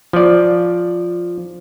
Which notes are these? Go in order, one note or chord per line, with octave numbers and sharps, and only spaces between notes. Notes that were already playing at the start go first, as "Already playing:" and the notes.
F3 D5